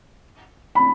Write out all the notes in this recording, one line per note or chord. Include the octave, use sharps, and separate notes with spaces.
B5